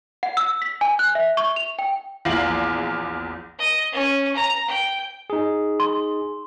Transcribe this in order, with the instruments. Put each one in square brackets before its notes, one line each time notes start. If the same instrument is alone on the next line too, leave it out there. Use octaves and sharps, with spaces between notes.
[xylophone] F#5
E6
B6
G#5
F#6
E5
C#6
F7
G5
[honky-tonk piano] A#1 E2 F5 F#7
[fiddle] D#5
C#4
A#5
G5
[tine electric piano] D#4 G#4
[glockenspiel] C6